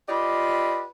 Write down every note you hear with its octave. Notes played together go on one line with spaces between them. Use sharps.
F4 G4 B4 D5 D#5